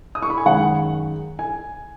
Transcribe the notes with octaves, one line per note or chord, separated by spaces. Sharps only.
D#6
C#6
B5
G#5
F#2 D#3 G#3 F#5
G#5